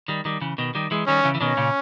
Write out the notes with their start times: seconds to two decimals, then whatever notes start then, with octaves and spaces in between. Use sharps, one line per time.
0.08 D#3 G3
0.25 D#3 G3
0.41 C#3 E3
0.58 B2 D#3
0.75 D#3 G3
0.91 E3 G#3
1.07 D#3 G3 C#4
1.24 C#3 E3
1.35 E3
1.41 B2 D#3 C#4
1.57 A#2 C#3